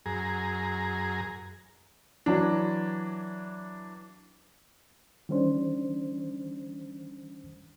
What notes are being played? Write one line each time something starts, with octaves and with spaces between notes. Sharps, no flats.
F#2 G#4 A#5
E3 F#3 D4
D#3 E3 G3 C#4 D4 C5